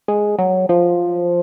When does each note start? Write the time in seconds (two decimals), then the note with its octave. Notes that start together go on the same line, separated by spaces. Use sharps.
0.08 G#3
0.39 F#3
0.69 F3